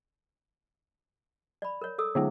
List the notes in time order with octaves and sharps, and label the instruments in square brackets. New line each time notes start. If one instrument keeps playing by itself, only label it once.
[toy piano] D5 B5
A#4 C#5
A4 D#6 E6
[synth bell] D3 F#3 G#3 [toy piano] G#4